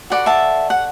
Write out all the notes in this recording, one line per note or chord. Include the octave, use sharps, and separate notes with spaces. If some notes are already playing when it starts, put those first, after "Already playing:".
F#4 A4 D5 F#5 B5
E5 A5
F#5